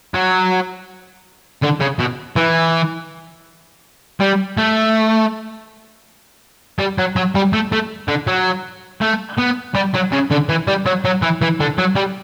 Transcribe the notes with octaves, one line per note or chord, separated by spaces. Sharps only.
F#3
D3
C#3
B2
E3
G3
A3
G3
F#3
F#3
G3
A3
A3
D3
F#3
A3
B3
G3
F#3
C#3
D3
E3
G3
F#3
F#3
E3
E3
D3
F#3
G3